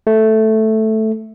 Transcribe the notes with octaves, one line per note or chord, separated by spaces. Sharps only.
A3